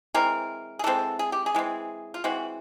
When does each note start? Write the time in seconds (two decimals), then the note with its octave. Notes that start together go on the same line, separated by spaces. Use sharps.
0.14 E3 G#3 C4 A#4
0.79 G#4
0.84 E3 G#3 C4 A4
1.19 G#4
1.32 G4
1.46 G#4
1.55 E3 G#3 C4
2.14 F4
2.24 E3 G#3 C4 F#4